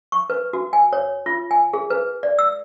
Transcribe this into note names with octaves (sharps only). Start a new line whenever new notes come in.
C#6
B4
F#4
G#5
C#5
F4
G#5
G#4
B4
D5
E6